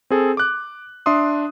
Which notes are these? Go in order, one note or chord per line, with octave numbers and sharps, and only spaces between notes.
C4 G#4 A4
D6 F#6
D4 E5 C6 D#6